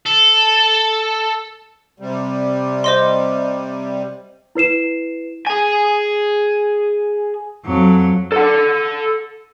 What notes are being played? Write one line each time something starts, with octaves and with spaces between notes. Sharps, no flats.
A4
C3 G3
C5 D#5 C6
E4 B4 C7 E7
G#4 G#5
F2 F#3
A4 F#5